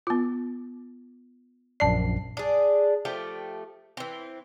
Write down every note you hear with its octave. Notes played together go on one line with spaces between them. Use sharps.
B3 F4
A#1 F#2 D5 A5 C7
D4 G#4
F3 A3 G4 G5
E3 C4